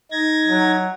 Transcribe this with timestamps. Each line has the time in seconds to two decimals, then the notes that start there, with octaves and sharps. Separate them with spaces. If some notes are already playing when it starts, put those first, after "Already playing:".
0.12 D#4 G#6 A#6
0.47 F#3